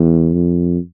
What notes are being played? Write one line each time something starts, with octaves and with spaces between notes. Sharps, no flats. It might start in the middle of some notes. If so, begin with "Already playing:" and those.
Already playing: E2
F2